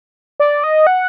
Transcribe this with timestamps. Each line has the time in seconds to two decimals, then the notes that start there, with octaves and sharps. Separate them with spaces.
0.40 D5
0.64 D#5
0.87 F#5